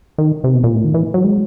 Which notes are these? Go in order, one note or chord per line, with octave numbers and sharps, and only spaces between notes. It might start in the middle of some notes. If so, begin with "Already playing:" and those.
D#3
C3
B2
A#2
A2
D#3
E3
F#3
G#3